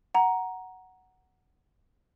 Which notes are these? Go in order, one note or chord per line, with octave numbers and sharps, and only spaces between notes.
F#5 A#5